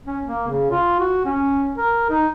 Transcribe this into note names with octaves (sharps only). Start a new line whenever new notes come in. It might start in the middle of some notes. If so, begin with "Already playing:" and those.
C#4
A#3
C#3
F4
F#4
C#4
A#4
D#4